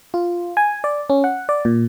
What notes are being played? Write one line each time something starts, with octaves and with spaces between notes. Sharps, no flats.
F4
G#5
D5
C#4
F#5
D5
A#2